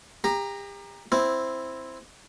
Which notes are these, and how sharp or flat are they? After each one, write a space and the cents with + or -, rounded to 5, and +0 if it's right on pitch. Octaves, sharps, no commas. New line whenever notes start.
G4 +40 A#5 +0
C4 +0 E4 +0